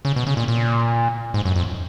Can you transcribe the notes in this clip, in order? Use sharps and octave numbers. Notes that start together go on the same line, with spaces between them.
C#3
B2
C#3
A#2
A#2
G#2
F#2
F2